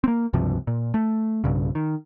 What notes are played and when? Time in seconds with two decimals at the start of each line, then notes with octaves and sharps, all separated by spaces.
0.04 A#3 C4
0.33 C#2 G2 C3 F3
0.67 A#2
0.94 A3
1.44 B1 G2 C#3
1.75 D#3